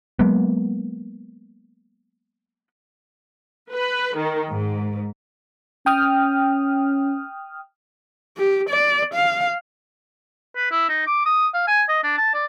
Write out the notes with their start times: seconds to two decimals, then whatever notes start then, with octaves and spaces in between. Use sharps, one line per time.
0.19 F#3 G#3 A#3 B3
3.72 B4
4.16 D#3
4.52 G#2
5.86 C#4 G5 D#6 F6
8.37 G4
8.69 D5
9.14 F5
10.56 B4
10.71 E4
10.89 D#4
11.07 D6
11.25 D#6
11.54 F5
11.68 G#5
11.89 D#5
12.03 D4
12.18 A5
12.34 D5